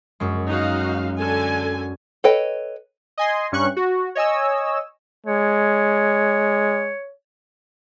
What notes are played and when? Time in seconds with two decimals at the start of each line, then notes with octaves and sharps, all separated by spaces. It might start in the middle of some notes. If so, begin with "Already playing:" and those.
0.20 F#2 G#3
0.49 D#4 F#4 F5
1.17 D3 A4 G#5
2.24 A4 B4 C#5 D#5 G5
3.18 D#5 G#5 C6
3.52 G2 C#4 C#6 F#6
3.77 F#4
4.15 C#5 D#5 G#5 E6
5.26 G#3 C#5